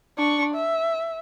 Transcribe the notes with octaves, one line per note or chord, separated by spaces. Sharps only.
D4 C#6
E5